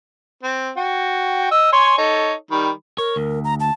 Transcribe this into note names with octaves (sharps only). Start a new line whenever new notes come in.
C4
F#4 G5
D#5 E6
C#5 G#5 C6
D#4 A4 C#5
D#3 G3 B5
A#4 C#5
D2
A#5
A5